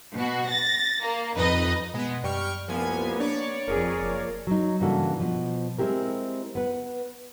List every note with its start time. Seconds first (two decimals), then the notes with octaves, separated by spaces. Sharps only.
0.15 B2 F#4
0.49 A6 A#6
1.03 A#3
1.36 F2 D#4 B4 D#5
1.94 B2 G#3 B3
2.24 F#2 G3 G5 C#6 F6
2.68 C2 F3 A#3 B3 G#5
3.20 D4 C#5 D5
3.68 F#1 F2 G#4 A#4
4.01 F#1 F3 A#3
4.47 F#3 D#4
4.80 G2 C#3 E3 A#3 F#4 A4
5.20 B2 F3
5.78 G#3 C4 E4 G4 A#4
6.55 B3 B4